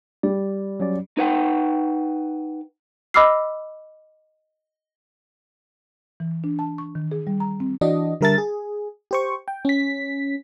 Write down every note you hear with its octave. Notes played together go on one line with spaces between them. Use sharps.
G3 D5
F#3 C#4 D5
D#4 B4 F#5 G5
D#5 B5 D6 E6 F6 C7
E3
D4
A5
C#6
D#3
G#4
G3
A#5
C4
E3 D4 F#4 D#5
D3 G3 A#4 E5 A5 A6
G#4
G4 C5 C#6
G5
C#4 B6